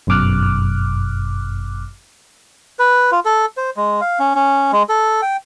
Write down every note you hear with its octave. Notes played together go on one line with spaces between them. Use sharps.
G1 F#2 B2 D6 F6 F#6
B4
F4
A4
C5
G#3
F5
C#4
C#4
G#3
A4
G5